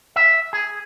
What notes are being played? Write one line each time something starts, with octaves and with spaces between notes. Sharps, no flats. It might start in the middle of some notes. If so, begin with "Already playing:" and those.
E5
G#4